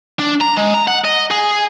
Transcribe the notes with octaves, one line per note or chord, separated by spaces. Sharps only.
D4
A#5
G#3
A#5
F#5
D#5
G#4